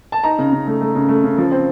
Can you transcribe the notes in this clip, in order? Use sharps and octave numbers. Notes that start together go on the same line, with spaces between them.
A5
D#4 A#5
C#3
C#3
A3
A3
C#3
A3
C#3
F3
C4